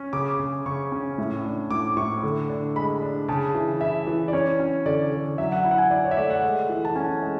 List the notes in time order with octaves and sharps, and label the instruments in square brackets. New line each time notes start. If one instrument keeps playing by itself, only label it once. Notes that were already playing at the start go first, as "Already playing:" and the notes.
Already playing: [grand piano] C#4
C#3 D6
C#3
C#3 C#6
C#4
A2
D4
A2 D6
A2 C#6
D3
D4
G#3 B5
D4
C#3 A5
E3
E4 E5
E3
D5
C#4 C#5
C#4
D3 D5
D3
F#3 E5
F#5
E4
F#5
G#5
E4 D5
C#5
E5
A3 D5
F#5
G#3
E3
A5
C#4 G#5
G#3